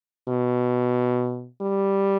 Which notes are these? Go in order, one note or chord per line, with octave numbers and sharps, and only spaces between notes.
B2
G3